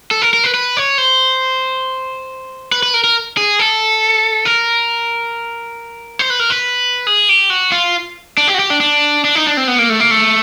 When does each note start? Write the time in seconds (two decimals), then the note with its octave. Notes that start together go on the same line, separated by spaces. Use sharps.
0.11 A4
0.22 A#4
0.33 A#4
0.44 B4
0.54 B4
0.77 C#5
0.98 C5
2.72 B4
2.83 B4
2.94 A#4
3.04 A#4
3.37 G#4
3.59 A4
4.45 A#4
6.19 C5
6.30 B4
6.40 A#4
6.50 B4
7.07 G#4
7.29 G4
7.50 F#4
7.72 F4
8.37 D4
8.48 G4
8.54 F#4
8.59 G4
8.70 D4
8.80 D4
9.25 D4
9.35 D#4
9.47 D4
9.57 C4
9.68 B3
9.79 A#3
9.90 A3
10.00 A#3
10.11 A3